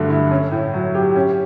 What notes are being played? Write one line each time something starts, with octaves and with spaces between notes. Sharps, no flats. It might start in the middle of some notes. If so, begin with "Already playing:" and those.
Already playing: G2 D3 F#3 A3
E4
C#4
A2
F#3
G4
C#4